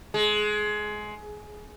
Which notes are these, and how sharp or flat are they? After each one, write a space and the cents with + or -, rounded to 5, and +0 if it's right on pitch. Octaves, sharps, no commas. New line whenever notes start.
G#3 +20